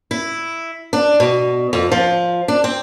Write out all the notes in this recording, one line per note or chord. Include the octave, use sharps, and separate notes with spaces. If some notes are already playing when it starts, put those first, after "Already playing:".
E4
D4
B2
F2
F3
D4
C4